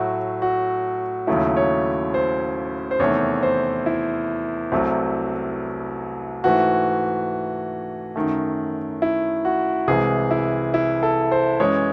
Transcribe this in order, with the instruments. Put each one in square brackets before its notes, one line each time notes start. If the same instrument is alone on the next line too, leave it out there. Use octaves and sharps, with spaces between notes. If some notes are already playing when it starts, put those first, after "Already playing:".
Already playing: [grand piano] A2 F#3 A3 F#4
F#4
D#2 C#3 F#3 A3 E4
C#5
C5
C5
E2 C3 D#3 A3 C#5
C5
E4
C2 C3 F#3 A3
G#2 E3 A3 F#4
F#2 D#3 A3
E4
F#4
C2 C3 E3 G#3 G#4
E4
E4
A4
C5
F#2 E3 G#3 C#5